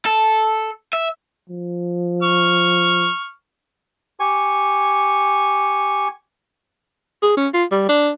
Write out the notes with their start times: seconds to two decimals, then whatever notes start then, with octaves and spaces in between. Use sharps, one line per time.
0.06 A4
0.93 E5
1.49 F3
2.23 C#6 F6
4.20 G4 G#5 C#6
7.22 G#4
7.37 C#4
7.54 F4
7.71 G3
7.89 D4